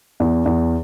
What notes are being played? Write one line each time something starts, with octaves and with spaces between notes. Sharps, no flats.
E2
E2